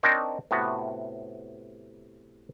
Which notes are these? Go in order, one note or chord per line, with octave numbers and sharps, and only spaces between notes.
C4 D4 D#4 A#4 C5 C#5
A2 C3 B3 F#4